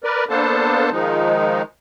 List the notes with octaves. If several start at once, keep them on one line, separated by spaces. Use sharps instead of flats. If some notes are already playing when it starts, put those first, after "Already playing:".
A#4 B4 D5
A#3 B3 D4 A4 C5 A5
D#3 F3 G#3 D#4